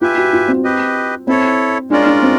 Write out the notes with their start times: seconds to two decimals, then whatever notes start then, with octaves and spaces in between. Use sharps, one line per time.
0.01 F4 G4 B4 E5 G#5
0.18 F#4
0.33 F4
0.48 C4
0.64 G4 B4 D#5
1.27 C4 E4 A4 C#5
1.90 G#3 C#4 D4 F4 A#4 D5
2.06 D4
2.22 C4